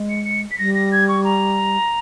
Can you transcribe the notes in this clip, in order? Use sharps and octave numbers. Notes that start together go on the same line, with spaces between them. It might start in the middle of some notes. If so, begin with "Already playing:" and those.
Already playing: G#3
C#7
C#7
B6
G3 A#6
A#6
G#6
C#6
A#5